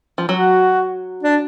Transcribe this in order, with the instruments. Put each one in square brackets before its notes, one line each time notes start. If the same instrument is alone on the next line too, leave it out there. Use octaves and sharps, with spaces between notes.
[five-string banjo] F3
[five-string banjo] F#3 [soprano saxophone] F#4
[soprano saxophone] D4